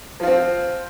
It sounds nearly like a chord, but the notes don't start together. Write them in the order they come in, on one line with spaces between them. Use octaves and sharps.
F3 F4 C4